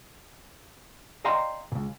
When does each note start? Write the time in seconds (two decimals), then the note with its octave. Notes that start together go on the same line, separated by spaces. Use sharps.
1.25 D5 D#5 F5 G5 A#5 C6
1.72 C#2 A#2